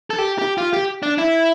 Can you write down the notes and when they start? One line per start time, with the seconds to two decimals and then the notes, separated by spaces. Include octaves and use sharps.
0.10 A4
0.18 G4
0.38 G4
0.58 F4
0.73 G4
1.03 D4
1.18 E4